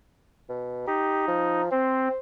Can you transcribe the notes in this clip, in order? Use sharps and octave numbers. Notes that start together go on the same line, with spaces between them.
B2
D#4 G4
F3
C4 C5